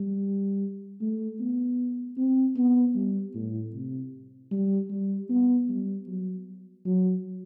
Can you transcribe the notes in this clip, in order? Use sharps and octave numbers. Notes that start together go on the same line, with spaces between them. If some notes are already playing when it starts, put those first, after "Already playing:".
Already playing: G3
A3
B3
C4
B3
G3
A2
C3
G3
G3
B3
G3
F#3
F#3